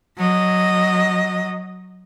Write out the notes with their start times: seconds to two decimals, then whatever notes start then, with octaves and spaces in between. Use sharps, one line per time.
0.17 F#3 D#5